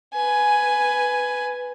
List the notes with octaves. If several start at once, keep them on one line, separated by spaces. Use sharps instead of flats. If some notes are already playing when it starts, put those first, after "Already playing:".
B4 G#5